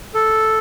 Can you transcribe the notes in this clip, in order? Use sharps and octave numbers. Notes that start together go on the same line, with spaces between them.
A4